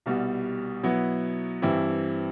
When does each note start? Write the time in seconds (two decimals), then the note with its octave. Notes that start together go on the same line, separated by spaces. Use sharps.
0.06 C2 B2 G3
0.83 B2 F#3 B3 E4
1.62 G2 E3 G3 C4 E4